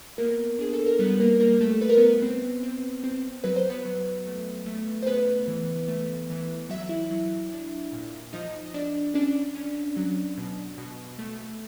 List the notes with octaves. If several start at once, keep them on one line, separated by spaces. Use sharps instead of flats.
A#3 B3 A#4
D4 G#4
A4
A#4
G3 B3 B4
A#3 A#4
G3 A#3 A#4
A3 A4
A3 B4
A#4
B3 B4
C4
C4
C4
F#3 B4
C5
B3 B4
F#3
A3
A3
C5
C#3 B3 B4
E3
A3
E3
F#3 E5
E4 E5
F#3
D4
A#2
F3 D#4 D#5
D#5
F3 D4 D5
C#4 D4 D5
C#4
F#3
B2
B2
A3